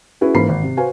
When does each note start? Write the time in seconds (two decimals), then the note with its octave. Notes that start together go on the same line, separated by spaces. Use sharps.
0.21 C#4 E4 F#4 G#4 B4
0.35 G#2 E3 A#3 B5 C7
0.49 G#1
0.63 C3
0.77 F#4 B4 C5 F5 G#5